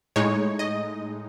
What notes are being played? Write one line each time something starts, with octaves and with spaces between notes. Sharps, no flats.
A2 G#3 D#4 C#5
D#5